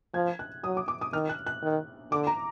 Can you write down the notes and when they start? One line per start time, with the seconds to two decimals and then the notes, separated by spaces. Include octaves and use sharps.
0.14 F3 G#6
0.39 F#6
0.64 F#3 D#6
0.77 D6
0.88 D6
1.01 D#6
1.13 D#3 F6
1.29 F#6
1.46 F#6
1.63 D#3
2.12 D3 D6
2.27 A#5